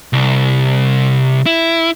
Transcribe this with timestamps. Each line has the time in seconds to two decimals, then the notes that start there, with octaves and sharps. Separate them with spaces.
0.13 C2
1.46 E4